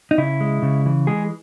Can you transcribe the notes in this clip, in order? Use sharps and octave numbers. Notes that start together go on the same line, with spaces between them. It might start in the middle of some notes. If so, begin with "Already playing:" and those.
D#4
C#3 E4
G#3
C#3
E3
G#3 G#4